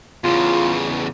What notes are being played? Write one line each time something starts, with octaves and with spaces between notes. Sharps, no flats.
E2 C#3 F4